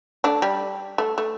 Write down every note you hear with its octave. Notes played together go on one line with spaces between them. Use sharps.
A3 D4
G3
A3
A3